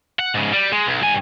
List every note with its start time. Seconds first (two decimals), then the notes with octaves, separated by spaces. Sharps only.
0.19 F#5
0.34 G#2 C#3
0.53 G3
0.73 G#3
0.87 B1
1.02 G2 G#5